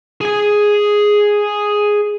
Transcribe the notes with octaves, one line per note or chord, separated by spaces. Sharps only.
G#4 G#5